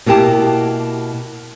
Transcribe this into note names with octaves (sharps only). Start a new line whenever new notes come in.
B2 A#3 E4 G4 A5